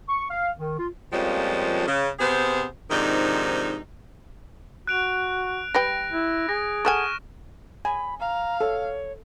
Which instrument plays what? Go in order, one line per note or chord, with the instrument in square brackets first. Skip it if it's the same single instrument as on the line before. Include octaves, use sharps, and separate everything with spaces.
[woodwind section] C#6
F5
D#3
F4
[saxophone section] F2 F3 G3 G#3 A#3 C#4
C#3
C3 B3 G#4 C5
G#2 C3 D#3 F3 D4 D#4
[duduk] F#4 [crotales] F#6 D7 F7
[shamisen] G3 B4 G5 [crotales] A#6 D7
[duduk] E4
[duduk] G#4 [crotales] A#6
[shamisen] A4 F#5 G#5 [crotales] C#6 F6 E7
[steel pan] G#5 [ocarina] B5
[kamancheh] F5 [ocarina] A#5
[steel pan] A4 [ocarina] C#5